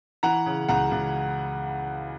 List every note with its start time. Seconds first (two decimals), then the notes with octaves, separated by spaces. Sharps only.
0.23 E3 F#5 A#5
0.46 C#3
0.69 C#2 F#5 A#5
0.91 C#2